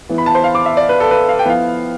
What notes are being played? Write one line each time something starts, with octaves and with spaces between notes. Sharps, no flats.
E3 B3 E4
B5
A5
C5
F5
D6
E5
D5
B4
A4
B4
F5
G5
F3 B3 E4 F5